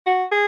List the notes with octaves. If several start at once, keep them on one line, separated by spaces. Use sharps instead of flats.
F#4
G#4